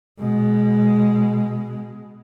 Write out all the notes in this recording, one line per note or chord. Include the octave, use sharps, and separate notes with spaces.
B2 G#3